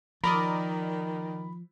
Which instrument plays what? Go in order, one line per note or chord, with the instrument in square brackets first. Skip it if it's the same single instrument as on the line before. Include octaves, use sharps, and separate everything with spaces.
[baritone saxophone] D#3 [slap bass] F3 [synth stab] A#4 D5 D#5 [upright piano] B5